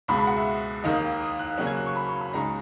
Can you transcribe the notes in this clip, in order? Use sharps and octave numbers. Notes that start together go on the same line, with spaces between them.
C#2 B2 G#3 B5
B5
F#5
E5
D#2 D#3 A#3 D#5
D#6
F#6
C#3 F#3 A#3 C#4 F#6
G#6
F#6
C#6
B5
C#6
B5
C#2 C#3 G#3 D#4 A#5